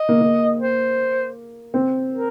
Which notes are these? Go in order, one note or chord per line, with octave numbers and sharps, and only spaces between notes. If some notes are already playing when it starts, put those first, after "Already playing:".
Already playing: D#5
A#3
A#3
C5
C4
A#4